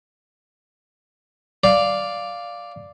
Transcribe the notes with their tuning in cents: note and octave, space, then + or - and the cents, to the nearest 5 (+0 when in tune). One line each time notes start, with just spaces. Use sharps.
D5 +0 F5 +0